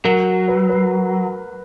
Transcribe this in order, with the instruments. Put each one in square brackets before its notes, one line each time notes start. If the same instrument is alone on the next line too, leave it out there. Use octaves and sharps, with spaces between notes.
[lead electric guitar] F#3 [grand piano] A#4
[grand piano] B4
B4